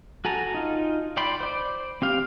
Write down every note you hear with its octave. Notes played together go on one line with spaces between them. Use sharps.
F#4 A4 G#5 A#5
D#4 F4
D5 G5 B5 C6
C5 D5
C4 G4 F5